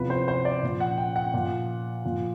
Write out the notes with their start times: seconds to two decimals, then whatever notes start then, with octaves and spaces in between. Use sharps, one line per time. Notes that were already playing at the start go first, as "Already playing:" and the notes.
Already playing: E2 C3 F3 B4
0.10 C5
0.28 C5
0.45 D5
0.63 A#2 F3
0.80 F#5
0.98 G5
1.16 F#5
1.34 A#2 F3
2.04 A#2 F3